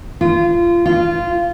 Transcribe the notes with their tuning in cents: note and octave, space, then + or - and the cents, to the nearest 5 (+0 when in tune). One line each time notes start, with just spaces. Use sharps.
F4 -25
F4 -15